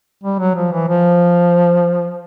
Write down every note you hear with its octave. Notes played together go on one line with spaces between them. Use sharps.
G3
F#3
F3
E3
F3